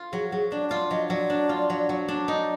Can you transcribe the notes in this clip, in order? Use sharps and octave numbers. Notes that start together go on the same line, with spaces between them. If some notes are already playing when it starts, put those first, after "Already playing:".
Already playing: F4
F#3 G#4
F#3 G#4
D4 D5
F4 D5
F#3 D#5
F#3 D5
D4
F4
F#3
F#3
D4
D#4 D5